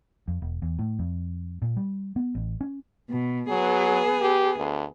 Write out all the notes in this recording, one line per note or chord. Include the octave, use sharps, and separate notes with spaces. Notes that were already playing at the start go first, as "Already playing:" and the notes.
F2
E1
E2
A2
F2
A#2
G3
B3
A1
C#4
B2
F#3 B3 G#4
G4
D2